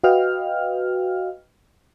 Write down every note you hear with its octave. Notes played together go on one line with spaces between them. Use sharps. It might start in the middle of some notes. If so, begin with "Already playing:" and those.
F#4 B4 D#5 F5 G5 F6